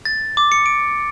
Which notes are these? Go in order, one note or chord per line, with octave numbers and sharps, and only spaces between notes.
A6
D6
C#7
D7